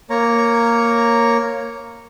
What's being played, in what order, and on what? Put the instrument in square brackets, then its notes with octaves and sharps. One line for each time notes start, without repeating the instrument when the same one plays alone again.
[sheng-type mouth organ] A#3 C#5 A#5